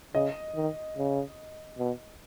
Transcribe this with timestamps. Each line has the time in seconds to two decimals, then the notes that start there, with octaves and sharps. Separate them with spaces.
0.14 C#3 D#5
0.55 D#3
0.97 C#3
1.78 B2